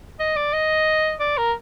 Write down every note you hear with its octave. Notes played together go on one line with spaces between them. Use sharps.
D#5
D5
D#5
D5
A#4